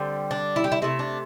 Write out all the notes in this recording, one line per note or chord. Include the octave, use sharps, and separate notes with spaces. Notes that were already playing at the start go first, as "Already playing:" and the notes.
Already playing: D3 G3 C4
D4
E4
G4
E4
C3 A3 E4
D4